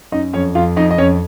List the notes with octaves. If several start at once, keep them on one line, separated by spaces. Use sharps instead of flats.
F#2 D#4 D#5
F2 C#4 C#5
F2 F4 F5
F2 D#4 D#5
D#5
F2 C#4 C#5